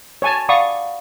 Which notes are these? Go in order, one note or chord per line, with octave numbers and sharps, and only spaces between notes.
C#5 G#5 A5
D5 F5 F#5 B5 C#6 D#6